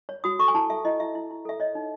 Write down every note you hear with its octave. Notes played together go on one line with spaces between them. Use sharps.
C#5
F#4 D#6
A4 C#6
G#5
E4 A5
A4 E5
E4 D#5
E4 E5
E4
E4
A4 E5
C#5 D#5
D#4